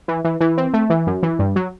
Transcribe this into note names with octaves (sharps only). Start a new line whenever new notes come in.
E3
E3
E3
C4
A3
E3
F#2
E3
G2
F#3